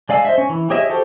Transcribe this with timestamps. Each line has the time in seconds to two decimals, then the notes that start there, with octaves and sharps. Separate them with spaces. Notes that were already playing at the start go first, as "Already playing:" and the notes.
0.09 G#3 D5 F5 G#5 E6
0.25 C5 D#5 E5
0.38 C#4
0.49 E3
0.70 G4 G#4 C#5 D#5 E5
0.89 F#4 G4 A4 C5